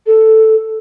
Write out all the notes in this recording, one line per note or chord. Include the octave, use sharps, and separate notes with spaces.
A4